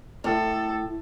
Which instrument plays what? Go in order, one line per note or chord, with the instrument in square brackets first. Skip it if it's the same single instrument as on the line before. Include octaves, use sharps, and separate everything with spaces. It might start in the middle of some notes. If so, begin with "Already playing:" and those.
[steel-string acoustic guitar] A2 [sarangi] A4